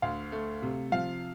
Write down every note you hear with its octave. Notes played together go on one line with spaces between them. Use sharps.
D2 F5
A3
C3
F3 F5